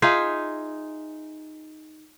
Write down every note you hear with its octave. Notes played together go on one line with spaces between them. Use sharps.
D#4 F4 G#4 E5